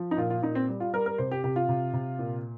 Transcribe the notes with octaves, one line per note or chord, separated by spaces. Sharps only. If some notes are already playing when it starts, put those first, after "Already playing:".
Already playing: F3
D#4
A#2 F4
F4
A#2 D#4
C4
G3
F4
G3 A#4
A#4
C3 C5
G4
C3 G4
F4
C3
C3
A#2